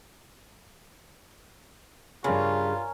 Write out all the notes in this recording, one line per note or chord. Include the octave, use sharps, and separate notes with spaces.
G2 C#3 C#4 F4 A#4 B5